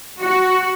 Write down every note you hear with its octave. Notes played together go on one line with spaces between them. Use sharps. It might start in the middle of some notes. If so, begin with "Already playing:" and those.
F#4